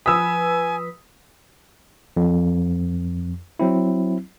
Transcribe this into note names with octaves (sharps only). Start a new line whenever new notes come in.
F3 B4 G#5 D#6 E6 B6
F2
F#3 C4 E4